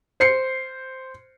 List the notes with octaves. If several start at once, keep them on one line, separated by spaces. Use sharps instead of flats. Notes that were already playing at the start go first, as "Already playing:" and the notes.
C5 C7 C#7